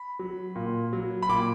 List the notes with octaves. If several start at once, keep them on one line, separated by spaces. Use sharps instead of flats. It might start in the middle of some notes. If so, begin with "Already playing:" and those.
Already playing: B5
F#3
A#2
F#3
B5
A#2 D6